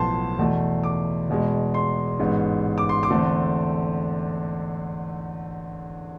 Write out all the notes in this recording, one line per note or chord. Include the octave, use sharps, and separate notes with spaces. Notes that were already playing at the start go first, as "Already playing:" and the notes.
Already playing: B1 A2 F3 B3 C5 A5 C6
E2 B2 A3
D6
E2 B2 G#3
C6
A1 G#2 G#3 B3
D6
C6
D6
E2 D3 A3 C4